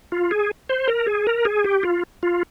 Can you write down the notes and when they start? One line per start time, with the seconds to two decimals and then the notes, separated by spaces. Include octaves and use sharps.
0.12 F4
0.31 G#4
0.69 C5
0.88 A#4
1.07 G#4
1.27 A#4
1.45 G#4
1.64 G4
1.83 F4
2.23 F4